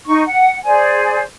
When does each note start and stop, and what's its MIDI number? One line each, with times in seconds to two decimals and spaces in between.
0.06 0.23 63
0.06 0.23 85
0.26 0.58 78
0.65 1.21 68
0.65 1.21 72
0.65 1.21 74
0.65 1.21 80